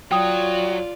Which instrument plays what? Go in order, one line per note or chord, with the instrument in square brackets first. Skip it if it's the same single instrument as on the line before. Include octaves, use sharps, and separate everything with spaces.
[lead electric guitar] F#3 [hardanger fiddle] F4 D5 [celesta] G5 D#6